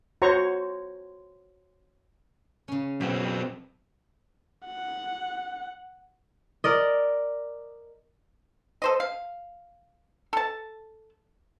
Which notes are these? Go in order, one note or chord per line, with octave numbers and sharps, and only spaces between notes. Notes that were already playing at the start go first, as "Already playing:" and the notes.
F#4 C5 C#5 A#5 C#6
C#3 C#4
F#2 B2 C4 G#5
F#5
A#4 D5 D#5
A4 C5 D#5
F5
A4 A5